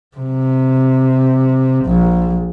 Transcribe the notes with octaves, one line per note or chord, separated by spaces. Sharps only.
C3
A#1